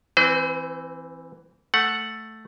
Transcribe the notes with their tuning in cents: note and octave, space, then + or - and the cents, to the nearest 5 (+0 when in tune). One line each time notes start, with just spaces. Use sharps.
E3 +0 C4 +0 C5 -45
A3 +0 F#5 +0